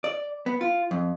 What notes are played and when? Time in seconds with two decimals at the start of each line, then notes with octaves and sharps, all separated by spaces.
0.04 D5
0.46 B3
0.61 F4
0.91 F2